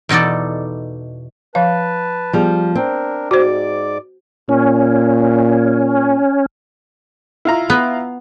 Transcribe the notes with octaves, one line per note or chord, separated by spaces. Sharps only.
E2 B2 D#4 A4 D5
F3 B4 F5 A5
F3 G3 B3 G#4
C4 D4 A#4
G#2 F#4 C5 D5 D6
A#2 C#4
E4 F4 A#5
B3